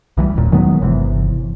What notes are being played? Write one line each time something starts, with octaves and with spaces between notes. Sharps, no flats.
B1 E3 F#3 G3
D#1 D#2 A#2
D#3 F#3 G#3 B3
G1 C3 E3